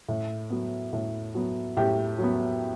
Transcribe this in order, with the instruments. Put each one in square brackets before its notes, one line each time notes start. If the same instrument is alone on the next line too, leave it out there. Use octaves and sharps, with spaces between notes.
[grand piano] A2
F#3 B3
A2
F#3 B3
A2 G4
F#3 B3